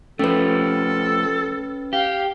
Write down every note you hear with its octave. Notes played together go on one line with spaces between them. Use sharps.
F3 A3 C#4 A4 B4
G4 F5